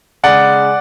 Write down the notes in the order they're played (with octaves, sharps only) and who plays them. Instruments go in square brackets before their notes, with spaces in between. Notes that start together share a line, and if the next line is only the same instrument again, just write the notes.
[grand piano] C#3 G#3 D5 F#5